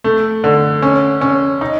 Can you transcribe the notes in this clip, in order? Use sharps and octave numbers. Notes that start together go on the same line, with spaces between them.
A3
D3
C#4
C#4
D#4